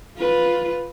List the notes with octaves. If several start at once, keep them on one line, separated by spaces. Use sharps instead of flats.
F4 B4